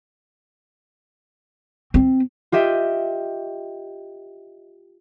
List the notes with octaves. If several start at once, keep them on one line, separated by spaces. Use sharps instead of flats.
C4
F4 G4 D#5 E5 G5